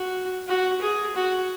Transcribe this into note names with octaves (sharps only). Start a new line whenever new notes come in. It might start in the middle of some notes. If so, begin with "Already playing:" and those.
Already playing: F#4
F#4
G#4
F#4